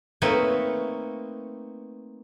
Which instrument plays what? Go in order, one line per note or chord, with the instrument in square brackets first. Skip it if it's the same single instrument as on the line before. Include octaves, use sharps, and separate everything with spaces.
[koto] A3 A#3 C4 D#4 B4 C#5